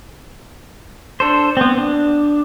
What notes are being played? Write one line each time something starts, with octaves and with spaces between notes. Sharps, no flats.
D4 A4 C5
B3 C4
D4